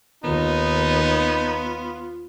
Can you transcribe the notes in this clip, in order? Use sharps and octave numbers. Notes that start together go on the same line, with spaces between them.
D#2 B3 D#4 F4